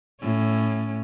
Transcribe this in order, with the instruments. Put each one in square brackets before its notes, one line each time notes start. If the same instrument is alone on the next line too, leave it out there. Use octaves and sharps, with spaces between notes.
[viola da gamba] A2 C#4